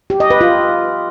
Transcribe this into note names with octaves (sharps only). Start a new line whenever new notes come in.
G4
D#5
B4
F4